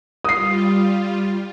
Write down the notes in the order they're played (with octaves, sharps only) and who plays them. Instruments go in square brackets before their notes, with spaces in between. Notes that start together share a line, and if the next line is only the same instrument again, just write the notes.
[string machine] G3 F4 [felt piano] D#6 C7